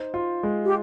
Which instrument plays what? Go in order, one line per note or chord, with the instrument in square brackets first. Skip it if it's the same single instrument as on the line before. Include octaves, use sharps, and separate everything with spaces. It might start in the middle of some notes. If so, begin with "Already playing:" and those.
Already playing: [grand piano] D#4 C5
F4
G#3
[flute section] G4